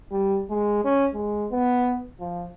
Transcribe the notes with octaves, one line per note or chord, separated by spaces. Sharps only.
G3
G#3
C#4
G#3
B3
F3